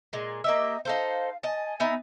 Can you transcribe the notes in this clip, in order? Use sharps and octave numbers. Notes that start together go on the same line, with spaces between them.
A#2 G#3
A#3 G4 D#5 E5
D#4 A4 C5 F5
D#5 G#5 A5
B3 D#4 E5